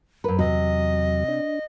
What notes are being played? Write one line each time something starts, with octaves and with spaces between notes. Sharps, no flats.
F#2 A#4 B4
E2 C3 F#3 D#5
D4